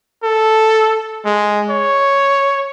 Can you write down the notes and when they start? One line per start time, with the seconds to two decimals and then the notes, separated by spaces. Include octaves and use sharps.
0.23 A4
1.25 G#3
1.70 C#5